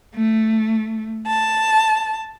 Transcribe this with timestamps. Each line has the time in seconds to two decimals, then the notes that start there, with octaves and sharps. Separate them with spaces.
0.15 A3
1.27 A5